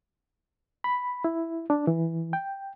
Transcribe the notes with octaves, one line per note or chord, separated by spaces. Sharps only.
B5
E4
D4
E3
G5